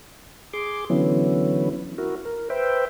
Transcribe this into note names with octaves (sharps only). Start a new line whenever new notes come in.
G#4 C6 D6
D3 E3 F#3 B3 C#4 E4
E4 F#4 A#4
A#4
B4 C5 E5 G5